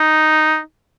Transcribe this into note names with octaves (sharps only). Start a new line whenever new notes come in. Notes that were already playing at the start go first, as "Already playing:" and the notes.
Already playing: D#4